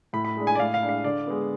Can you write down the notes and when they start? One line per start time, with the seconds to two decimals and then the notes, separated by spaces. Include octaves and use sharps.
0.13 A2 B5
0.25 B5
0.37 G#3 D4
0.47 G#5
0.55 D5
0.59 A2 F5
0.74 F5
0.82 G#3 D4
0.89 F5
1.04 D3 D5
1.27 G#3 B3